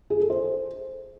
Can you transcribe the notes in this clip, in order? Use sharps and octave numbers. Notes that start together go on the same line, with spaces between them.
G#4
A4
C5